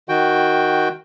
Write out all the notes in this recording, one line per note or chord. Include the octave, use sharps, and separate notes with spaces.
D#3 F#4 G5